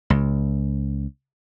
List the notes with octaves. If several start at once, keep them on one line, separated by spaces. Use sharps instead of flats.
C#2